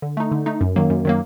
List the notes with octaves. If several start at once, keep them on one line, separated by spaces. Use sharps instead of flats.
D3
A3 D#4
D3
A3 D#4
F#2
D#3 F#3 A#3
F#2
D#3 F#3 A#3